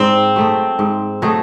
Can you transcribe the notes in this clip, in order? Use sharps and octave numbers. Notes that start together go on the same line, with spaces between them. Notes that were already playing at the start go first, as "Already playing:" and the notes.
Already playing: G#2 C4
F#3 A3 D#4
G#2
F#3 A3 D#4